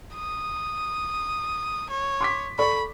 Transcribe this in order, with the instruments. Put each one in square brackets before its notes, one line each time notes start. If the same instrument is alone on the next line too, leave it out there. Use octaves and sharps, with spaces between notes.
[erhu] D#6
C#5
[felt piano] C6 D6 B6
[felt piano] A4 D5 C#6 [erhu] B5